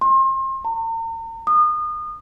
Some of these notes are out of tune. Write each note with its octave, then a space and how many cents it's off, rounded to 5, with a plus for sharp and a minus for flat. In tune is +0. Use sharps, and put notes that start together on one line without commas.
C6 +35
A#5 -45
D#6 -30